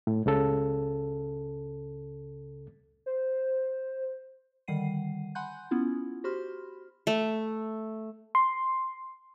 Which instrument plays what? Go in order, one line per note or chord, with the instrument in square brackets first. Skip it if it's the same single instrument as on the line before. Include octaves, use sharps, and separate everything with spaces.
[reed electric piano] A2
C#2 C#3 A4
[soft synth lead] C5
[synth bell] D3 D#3 G3 F#5 C7 D#7
F#5 G#5 B5 C6 F#6 G6
B3 C#4 E4 F4
F#4 G4 C5 B5 C6 F6
[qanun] A3
[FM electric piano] C6